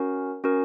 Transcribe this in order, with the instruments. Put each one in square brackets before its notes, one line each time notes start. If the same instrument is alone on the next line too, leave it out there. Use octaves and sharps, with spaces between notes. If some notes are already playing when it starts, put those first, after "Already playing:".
Already playing: [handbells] C#4 F#4 A#4
C#4 F#4 A#4